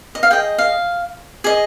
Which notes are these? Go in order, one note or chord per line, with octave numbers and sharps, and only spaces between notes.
D#5
F5
G#4 D#5 G5
F5
G#4 D#5